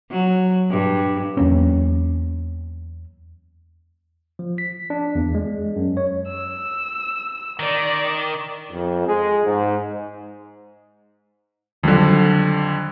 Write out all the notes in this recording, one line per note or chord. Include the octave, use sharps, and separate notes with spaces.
F#3
G2
E2 F#3 A#3 C#4
F3
B6
D4
E2
G#3
F#2
C#5
E6
D#3 D5
F2
G#3
G#2
F2 D3 D#3 F#3 G3